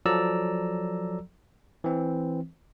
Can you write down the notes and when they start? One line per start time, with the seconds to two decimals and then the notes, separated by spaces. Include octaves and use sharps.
0.06 F3 F#3 A4 D5 A#5 E6
1.84 E3 C4